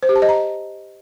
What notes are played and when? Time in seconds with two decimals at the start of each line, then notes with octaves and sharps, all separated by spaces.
0.03 C5
0.09 G4
0.16 A5
0.22 D#5
0.29 A#5